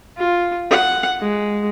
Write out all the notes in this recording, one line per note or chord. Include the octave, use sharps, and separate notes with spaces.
F4
F#5
G#3